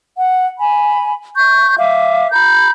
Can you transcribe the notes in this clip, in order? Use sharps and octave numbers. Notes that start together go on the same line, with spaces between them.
F#5
G#5 B5
C#6 G6
E5 F5 D6
A#5 B5 G6